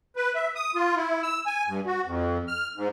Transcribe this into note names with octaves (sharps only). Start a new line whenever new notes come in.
B4
E5
D#6
F4
E4
E6
G#5
G2
F#4
F2
F6
G#2